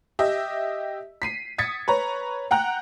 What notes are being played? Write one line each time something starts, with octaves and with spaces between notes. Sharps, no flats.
G4 D#5 E5
B6 C7 D#7
D#6 G#6 A6 B6 C#7
B4 C#5 A#5
F#5 G5 A#5 F#6